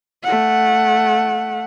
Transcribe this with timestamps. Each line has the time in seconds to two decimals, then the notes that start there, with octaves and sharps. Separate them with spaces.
0.23 A3 F#5